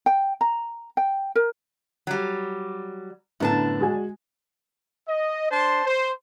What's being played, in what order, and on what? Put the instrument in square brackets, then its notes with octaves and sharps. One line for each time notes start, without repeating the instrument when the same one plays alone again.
[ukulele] G5
A#5
G5
A#4
[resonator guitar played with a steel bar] F#3 G3
[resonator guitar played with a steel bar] F#2 D4 A5 [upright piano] A2 D3 B3
[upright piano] G#3 F#4 G#5
[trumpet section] D#5
D4 C5 A5 C6
C5